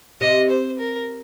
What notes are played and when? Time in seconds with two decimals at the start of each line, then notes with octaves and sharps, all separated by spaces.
0.21 C3 D#5
0.50 C5
0.79 A#4